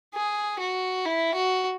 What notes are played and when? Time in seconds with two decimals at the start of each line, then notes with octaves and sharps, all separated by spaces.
0.15 G#4
0.60 F#4
1.05 E4
1.35 F#4